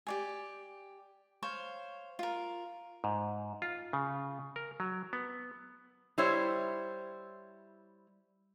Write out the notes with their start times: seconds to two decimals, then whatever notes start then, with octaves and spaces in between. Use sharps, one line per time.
0.07 G4 D5 G#5
1.43 C5 C#5 F5
2.19 F4 A#4
3.04 G#2
3.62 F4
3.93 C#3
4.56 A#4
4.80 F#3
5.13 B3
6.18 G3 E4 C5 C#5 E5